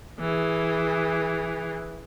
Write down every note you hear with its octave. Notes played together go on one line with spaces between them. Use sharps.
E3 G#4